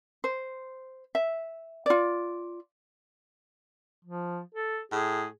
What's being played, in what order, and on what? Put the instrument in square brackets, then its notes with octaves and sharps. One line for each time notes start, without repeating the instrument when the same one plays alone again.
[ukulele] C5
E5
F4 D5
[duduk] F3
A4
[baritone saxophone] A2 [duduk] G#4